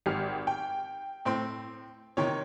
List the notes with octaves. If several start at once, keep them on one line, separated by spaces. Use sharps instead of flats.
G#1 G4 F6
G5
A2 C4 C6
C3 D#3 C#5